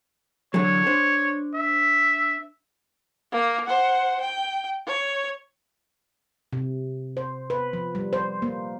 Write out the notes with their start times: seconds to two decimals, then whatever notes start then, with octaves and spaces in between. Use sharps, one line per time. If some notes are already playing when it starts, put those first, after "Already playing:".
0.54 D3 E3 F#3 C#5
0.86 D4 C5
1.54 E5
3.32 A#3 A#4
3.66 C5 F#5
4.21 G5
4.87 C#5
6.53 C3
7.17 C5
7.50 B4
7.73 F3
7.95 G3
8.13 C5
8.42 A#3